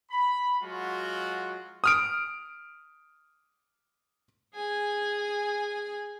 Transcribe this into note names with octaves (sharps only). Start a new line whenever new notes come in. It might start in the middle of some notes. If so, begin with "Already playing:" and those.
B5
F#3 G#3 F4 F#4
D#6 F6 D7
G#4 G#5